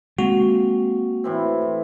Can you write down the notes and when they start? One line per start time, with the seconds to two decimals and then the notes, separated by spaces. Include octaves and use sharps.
0.18 G#3 A#3 C4 F#4
1.24 A2 E3 C4